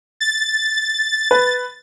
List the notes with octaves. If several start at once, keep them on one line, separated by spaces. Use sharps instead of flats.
A6
B4